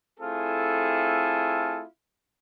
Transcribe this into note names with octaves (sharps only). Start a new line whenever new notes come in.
A3 C4 E4 F4 G#4 A4